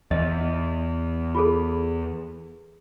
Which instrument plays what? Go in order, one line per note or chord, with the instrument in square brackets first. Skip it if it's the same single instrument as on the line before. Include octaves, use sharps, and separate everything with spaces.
[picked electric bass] E2 [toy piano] D#5
[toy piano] F4 G#4 A4